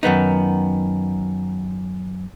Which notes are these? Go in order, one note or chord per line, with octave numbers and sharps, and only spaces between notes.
F#2 D#3 B3 D#4